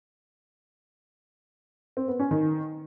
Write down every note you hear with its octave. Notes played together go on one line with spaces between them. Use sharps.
C4
B3
C#4
D#3